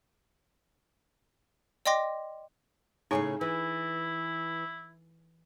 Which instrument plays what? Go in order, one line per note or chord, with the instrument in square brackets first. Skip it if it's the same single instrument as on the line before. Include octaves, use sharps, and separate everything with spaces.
[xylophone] D5 D#5 G5 C6 D6 A#6
[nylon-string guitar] A2 C#3 C#5 [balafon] D#4 G#4 G#5
[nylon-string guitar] E3 [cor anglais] E4